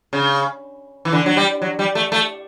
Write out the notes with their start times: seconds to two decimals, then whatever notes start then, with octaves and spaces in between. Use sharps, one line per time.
0.13 C#3
1.05 E3
1.12 D3
1.26 F#3
1.37 G3
1.62 F#3
1.79 G3
1.95 A3
2.12 A3